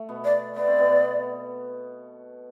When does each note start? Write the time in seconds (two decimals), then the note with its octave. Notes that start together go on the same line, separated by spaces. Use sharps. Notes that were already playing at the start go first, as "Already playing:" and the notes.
Already playing: A3
0.09 B2 B3
0.25 D5
0.55 B3 D5
0.67 C4
0.78 B2 B3